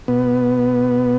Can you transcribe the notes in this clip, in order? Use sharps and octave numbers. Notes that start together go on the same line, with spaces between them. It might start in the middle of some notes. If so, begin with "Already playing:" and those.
B2 B3